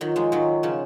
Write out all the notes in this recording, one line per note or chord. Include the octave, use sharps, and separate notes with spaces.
D#3 F#3 F4
F3 G#3
D#3 F#3
C#3 F3